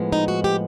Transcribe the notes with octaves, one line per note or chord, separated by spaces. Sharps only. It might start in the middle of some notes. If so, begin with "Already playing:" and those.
Already playing: A2 F3 G#3 B3
D#4
F#4
G4